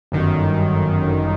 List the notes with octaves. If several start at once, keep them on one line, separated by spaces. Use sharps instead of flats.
G1 F#2 D#3